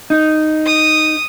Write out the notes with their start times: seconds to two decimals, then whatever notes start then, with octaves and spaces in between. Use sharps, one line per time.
0.10 D#4
0.66 D#6